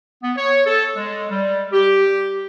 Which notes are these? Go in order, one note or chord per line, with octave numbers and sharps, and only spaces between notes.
B3
C#5
A4
G#3
G3
G4